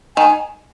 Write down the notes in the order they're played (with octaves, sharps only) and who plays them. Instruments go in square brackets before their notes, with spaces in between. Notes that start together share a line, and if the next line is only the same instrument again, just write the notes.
[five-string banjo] D#3 [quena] G#5